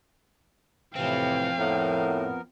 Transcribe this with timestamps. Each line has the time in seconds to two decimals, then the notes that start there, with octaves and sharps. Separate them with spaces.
0.96 A2 C3 E3 F3 C4 F5 G5
1.57 A2 B3 A#4